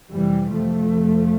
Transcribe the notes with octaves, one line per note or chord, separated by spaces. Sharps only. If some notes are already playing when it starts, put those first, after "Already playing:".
F2 C3 E3 G3
F2 C3 F3 A3
F2 C3